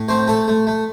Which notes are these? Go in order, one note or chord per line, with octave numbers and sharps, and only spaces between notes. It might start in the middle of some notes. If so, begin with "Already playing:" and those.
Already playing: A2
A3 C4 C5
A3 A4
A3
A3